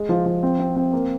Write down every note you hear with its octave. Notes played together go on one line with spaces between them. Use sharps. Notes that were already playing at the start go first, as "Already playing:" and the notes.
Already playing: G#3
F3
F3
C4
C4
C4
A#3